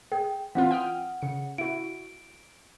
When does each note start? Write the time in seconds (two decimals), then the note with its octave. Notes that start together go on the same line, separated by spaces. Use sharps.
0.12 G#4 G5
0.55 E3 C4 F4 F#5
0.71 G5 D#6 F6
1.22 C#3 C#7
1.58 E4 F#4 D7